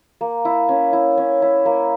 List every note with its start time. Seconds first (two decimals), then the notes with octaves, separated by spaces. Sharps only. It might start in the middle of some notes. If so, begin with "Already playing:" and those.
0.21 A#3
0.45 E4
0.69 C#4
0.93 E4
1.18 C#4
1.42 E4
1.66 A#3